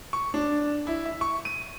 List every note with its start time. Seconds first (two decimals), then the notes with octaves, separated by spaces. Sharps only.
0.13 C#6
0.34 D4
0.87 E4
1.06 E5
1.21 C#6
1.45 D#7